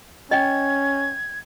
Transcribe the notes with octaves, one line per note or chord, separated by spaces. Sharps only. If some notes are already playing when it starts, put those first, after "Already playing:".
C#4 D#5 G5 G#6